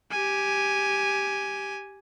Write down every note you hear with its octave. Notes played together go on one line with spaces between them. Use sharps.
G4 G#5